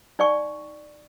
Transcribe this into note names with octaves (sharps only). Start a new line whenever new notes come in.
D#4 D5 G5 C#6